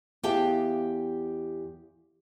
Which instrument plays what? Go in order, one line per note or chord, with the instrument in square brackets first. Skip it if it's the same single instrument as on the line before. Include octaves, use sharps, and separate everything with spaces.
[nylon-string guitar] E2 G4 G#4 F5 G5 A5